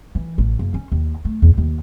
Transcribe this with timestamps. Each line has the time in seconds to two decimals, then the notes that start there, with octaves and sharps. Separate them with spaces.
0.15 E3
0.38 A1
0.59 F#1
0.74 C#4
0.92 D#2
1.25 A3
1.42 E2
1.58 D#2